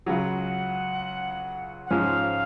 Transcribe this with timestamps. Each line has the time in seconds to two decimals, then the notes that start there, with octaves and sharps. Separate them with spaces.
0.06 C#2 C#3 F#3 F#5
1.86 F#5
1.90 G#2 F3 G#3 C#4 F5